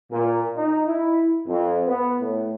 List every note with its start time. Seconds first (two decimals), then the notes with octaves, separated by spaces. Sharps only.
0.11 A#2
0.56 D#4
0.86 E4
1.46 F2
1.86 B3
2.20 A2